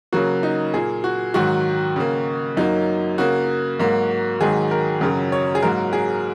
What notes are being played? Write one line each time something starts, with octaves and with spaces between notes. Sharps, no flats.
C#3 F#3 A#3 F#4
D#4
A#2 A#3 G#4
F#4
G#2 D#3 F#3 F#4
C#3 A#3
F#2 F#3 A#3 D#4
C#3 A#3 F#4
G#2 F#3 A#3
G#2 D#3 F#3 G#4
A#4
F#2 C#3 F#3 A#4
C#5
G#4
G#2 F#3 A#3 A#4
G#4